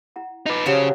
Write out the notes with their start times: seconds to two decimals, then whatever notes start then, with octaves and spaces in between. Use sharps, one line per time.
0.16 E4 F#5 A#5
0.46 D#4 F4 B4 D6
0.66 C#3 F3 F#3 D4 G4 G#4 F5